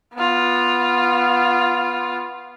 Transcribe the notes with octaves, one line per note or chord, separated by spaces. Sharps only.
B3 F4